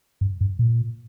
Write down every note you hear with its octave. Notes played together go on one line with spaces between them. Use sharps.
G2
G2
A#2